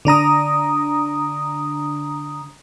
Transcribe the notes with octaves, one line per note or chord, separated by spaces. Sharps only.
D3 D4 A#5 D#6